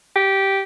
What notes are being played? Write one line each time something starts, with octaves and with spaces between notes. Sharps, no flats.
G4